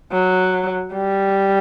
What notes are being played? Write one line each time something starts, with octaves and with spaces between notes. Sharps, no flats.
F#3
G3